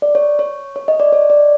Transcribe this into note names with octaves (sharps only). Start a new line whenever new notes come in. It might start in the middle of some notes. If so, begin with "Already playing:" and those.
D5
C#5
C#5
C#5
D#5
D5
C#5
D5